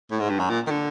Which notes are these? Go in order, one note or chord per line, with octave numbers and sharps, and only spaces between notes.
A2
G#2
G2
F#2
A#2
D#3
D3